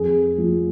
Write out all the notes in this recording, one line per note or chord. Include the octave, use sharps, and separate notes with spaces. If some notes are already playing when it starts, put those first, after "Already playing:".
Already playing: F2 G#4
F3